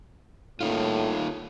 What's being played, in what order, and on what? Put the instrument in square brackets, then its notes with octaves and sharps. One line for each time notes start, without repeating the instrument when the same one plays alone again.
[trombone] A2 [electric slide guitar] A#3 D#4 F4